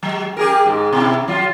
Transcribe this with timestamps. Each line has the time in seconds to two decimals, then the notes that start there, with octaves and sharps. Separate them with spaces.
0.03 F#3
0.37 G4 G#4 A#4
0.66 G#2
0.93 B2 E4
1.28 F#3 F4